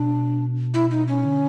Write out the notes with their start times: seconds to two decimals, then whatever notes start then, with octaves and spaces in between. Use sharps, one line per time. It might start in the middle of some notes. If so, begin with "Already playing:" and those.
Already playing: B2 D4
0.74 E4
0.91 D#4
1.08 C#4
1.25 D3